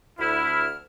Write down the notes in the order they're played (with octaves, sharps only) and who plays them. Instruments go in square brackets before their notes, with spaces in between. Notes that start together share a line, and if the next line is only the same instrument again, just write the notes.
[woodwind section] D2 F6 [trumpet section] E4